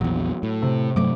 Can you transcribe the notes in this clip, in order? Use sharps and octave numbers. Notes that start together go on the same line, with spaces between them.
A#1 E2 F#3
A2
C3
G2 F#3 A3 D6